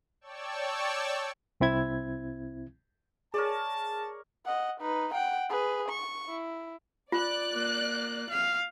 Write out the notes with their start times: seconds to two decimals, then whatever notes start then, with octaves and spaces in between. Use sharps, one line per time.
0.21 C#5 D5 G5 A5 C#6 E6
1.60 C2 C4 E4 G#6
3.34 G#4 A#4 C#5 D5 A5
4.45 D#5 F#5
4.80 D#4 B4
5.14 F#5 G5
5.49 G#4 B4
5.89 C#6
6.28 E4
7.12 F4 D5 F#6
7.53 A#3
8.30 F5